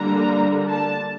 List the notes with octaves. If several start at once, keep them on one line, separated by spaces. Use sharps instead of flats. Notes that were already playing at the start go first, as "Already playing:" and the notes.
Already playing: D3 G3 A#3 D4 A#5
A5